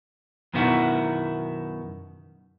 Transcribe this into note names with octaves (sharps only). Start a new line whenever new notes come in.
F#2 B2 D#3 B3 E4 F#4